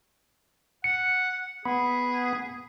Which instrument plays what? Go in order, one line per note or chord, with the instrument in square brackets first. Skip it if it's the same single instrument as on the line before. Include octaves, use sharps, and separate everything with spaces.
[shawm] F#5 [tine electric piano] C#7
[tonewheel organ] B3 [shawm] G#4 [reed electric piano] B5